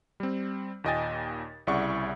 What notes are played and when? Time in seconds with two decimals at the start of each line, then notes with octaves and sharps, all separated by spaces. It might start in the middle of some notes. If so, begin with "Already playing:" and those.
0.20 G3 C4
0.84 D#2 A#2 D#5 G5 G#5 A6
1.67 C2 C#3 E4 D5 F#5 C#6